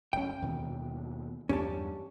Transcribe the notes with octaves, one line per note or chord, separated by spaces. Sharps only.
F#1 B2 C#4 G5
D#2 B2 E3
E2 G2 G3 C#4 G4 A5